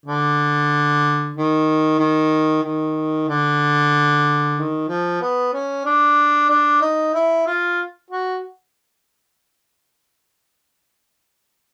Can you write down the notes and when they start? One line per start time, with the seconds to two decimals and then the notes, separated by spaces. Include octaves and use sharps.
0.06 D3
1.35 D#3
1.99 D#3
2.63 D#3
3.28 D3
4.57 D#3
4.89 F3
5.22 B3
5.53 C#4
5.86 D4
6.50 D4
6.82 D#4
7.15 E4
7.47 F4
8.11 F#4